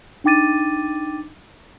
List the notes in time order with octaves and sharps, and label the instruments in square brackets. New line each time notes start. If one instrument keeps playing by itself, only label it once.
[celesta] D4 D#4 G5 D6 A6 D#7